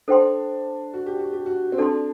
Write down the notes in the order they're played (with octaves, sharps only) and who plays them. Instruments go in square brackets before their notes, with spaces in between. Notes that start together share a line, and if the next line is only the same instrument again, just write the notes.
[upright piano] D4 [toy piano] A4 C5 G5 C6
[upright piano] F#4
G4
F#4
G4
F#4
C4
[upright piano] D4 [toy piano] A4 D5 A5 C6